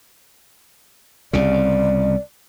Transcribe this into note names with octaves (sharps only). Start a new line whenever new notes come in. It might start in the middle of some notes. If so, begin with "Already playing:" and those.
C2 C#3 D5